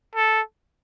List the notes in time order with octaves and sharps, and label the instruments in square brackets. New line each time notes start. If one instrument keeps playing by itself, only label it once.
[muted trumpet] A4